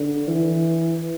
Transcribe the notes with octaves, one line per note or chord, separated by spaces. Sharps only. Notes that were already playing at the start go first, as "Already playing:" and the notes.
Already playing: D3
E3